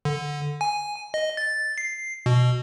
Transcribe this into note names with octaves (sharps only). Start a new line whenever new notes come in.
D3
G#5
D#5
A6
C7
B2